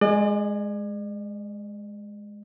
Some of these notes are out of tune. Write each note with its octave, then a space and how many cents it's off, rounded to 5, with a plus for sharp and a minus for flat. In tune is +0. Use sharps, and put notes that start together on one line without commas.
G#3 +0 D5 +45